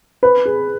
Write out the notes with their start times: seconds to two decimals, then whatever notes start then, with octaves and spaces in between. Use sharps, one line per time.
0.23 B4
0.45 G#4